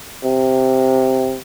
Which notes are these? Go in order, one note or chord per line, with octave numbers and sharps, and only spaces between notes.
C3